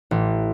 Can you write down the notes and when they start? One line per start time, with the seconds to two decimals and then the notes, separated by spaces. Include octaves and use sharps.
0.11 A1